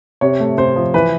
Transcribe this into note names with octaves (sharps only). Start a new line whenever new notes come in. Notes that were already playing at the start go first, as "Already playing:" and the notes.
C3 C#5
A3
C3 C5
F3
E3 B4